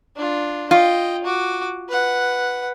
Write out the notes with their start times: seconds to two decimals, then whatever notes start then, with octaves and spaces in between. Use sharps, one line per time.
0.16 D4 F4
0.71 F4 D#5 G5
1.24 F#4 D6
1.89 B4 F#5